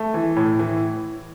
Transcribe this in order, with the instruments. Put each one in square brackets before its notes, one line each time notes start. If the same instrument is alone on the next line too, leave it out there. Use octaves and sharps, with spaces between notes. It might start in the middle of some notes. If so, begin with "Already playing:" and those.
Already playing: [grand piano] A3
E3
A2
E3